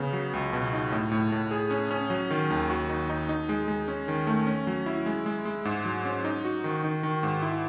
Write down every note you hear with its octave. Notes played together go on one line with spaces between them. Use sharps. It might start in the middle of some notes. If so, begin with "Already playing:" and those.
Already playing: C#3 B3
F#3
C#2
B2
D#4
A2
A2
A2
G#4
C#4
C#4
F#3
D#3
D#2
F#4
D#4
D#4
D#4
G#3
G#3
C#4
D#3
A3
C#4
F#3
E4
G#3
G#3
G#3
G#2
F#3
C#4
D#4
F#4
D#3
D#3
D#3
G#2
E4